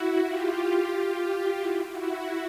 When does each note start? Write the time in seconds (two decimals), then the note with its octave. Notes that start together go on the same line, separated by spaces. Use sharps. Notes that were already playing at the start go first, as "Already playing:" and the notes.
Already playing: E4 F#4
0.24 F4 G4
0.91 F4 G4
1.58 E4 F#4
1.93 E4 F#4